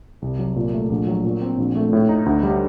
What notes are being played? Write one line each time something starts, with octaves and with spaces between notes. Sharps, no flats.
C2
F#3
A#2
A3
A#1
F#3
A#2
C4
A#1
A3
A2
D#4
D2
G3